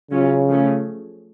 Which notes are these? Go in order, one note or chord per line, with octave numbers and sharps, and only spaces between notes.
C#3 F#3 C#4 F4
F3 A3 C#4 G#4